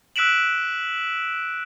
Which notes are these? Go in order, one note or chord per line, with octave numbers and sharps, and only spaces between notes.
E6 F#6 B6 D7 E7 F#7